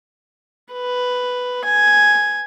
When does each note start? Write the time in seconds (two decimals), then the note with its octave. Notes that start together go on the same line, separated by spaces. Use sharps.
0.73 B4
1.65 G#5